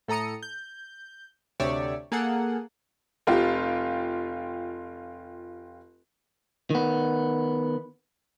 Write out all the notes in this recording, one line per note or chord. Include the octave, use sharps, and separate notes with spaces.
A2 A4 A#5 D#6 C#7
G6
D2 C3 G4 C#5 D5 E5
A#3 G#4 A4 F#5
F1 F4 G4
D#3 B3